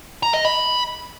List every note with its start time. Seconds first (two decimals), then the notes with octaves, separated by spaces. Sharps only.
0.23 A#5
0.34 D#5
0.45 B5